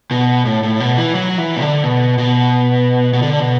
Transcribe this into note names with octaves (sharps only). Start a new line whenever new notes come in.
B2
A2
A2
B2
E3
F#3
E3
B2
D3
B2
B2
B2
D3
B2